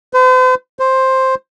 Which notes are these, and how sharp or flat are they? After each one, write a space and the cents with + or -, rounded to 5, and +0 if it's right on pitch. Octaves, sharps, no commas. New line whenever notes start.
C5 -45
C5 +5